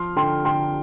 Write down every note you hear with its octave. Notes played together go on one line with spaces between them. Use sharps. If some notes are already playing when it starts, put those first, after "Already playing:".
Already playing: F3 C6 F6
D3 G5 C6
D3 G5 C6